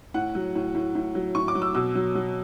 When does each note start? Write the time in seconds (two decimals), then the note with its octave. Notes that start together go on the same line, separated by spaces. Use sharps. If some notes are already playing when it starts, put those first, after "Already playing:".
0.14 A2 F#5
0.35 F#3
0.55 A2
0.75 A2
0.95 A2
1.15 F#3
1.35 A2 C#6
1.48 D6
1.55 F#3
1.62 E6
1.75 B2 E6
1.95 F#3
2.15 F#3